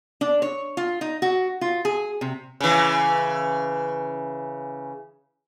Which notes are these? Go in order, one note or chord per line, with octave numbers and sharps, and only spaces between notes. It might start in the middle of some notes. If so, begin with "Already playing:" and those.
D4
C#5
F4
D#4
F#4
F4
G#4
C3
C#3 E3